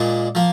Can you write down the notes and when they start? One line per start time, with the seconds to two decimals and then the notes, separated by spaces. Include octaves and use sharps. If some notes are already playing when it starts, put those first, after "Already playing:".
Already playing: A#2 G#3 D4
0.35 F3 A#3